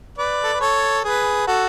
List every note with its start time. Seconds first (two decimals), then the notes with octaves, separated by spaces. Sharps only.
0.18 B4 D5
0.44 A4
0.53 B4
0.61 A4 C#5
1.04 G#4 B4
1.47 F#4 A4